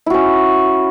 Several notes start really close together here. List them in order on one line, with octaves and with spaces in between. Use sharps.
E4 F#4 C#4